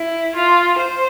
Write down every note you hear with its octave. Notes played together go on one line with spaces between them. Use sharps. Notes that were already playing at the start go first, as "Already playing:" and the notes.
Already playing: E4
F4
C5